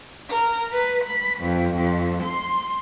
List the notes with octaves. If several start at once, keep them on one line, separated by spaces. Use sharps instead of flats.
A#4
B4
B5
F2
F2
C6